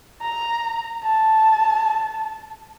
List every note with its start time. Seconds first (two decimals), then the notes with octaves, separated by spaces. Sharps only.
0.21 A#5
1.03 A5